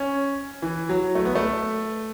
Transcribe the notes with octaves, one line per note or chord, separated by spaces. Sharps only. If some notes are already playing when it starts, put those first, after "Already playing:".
Already playing: C#4
E3
F#3
A3
B3
A3